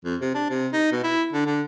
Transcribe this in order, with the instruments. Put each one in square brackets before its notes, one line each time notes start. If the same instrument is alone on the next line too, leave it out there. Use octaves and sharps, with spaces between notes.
[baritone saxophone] F2
C3
D4
C3
D#4
B2
E4
D3
D3